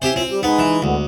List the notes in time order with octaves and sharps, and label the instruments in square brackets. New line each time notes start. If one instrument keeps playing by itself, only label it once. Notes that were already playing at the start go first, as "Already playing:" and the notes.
[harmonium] A2 E5 G#5 [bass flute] C4 [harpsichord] G4 C5
[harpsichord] C4 [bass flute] F4
[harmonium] G3 [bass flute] G4
[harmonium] G#3 G#4 B4 [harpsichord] B3 [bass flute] D#4
[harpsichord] E3
[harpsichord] D2 [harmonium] D3 B3 [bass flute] G#3